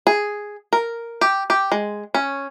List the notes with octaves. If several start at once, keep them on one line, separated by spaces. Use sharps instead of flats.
G#4
A#4
G4
G4
G#3
C#4